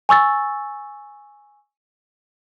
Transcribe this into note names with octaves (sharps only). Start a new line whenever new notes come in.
G#5 C#6 E6 A6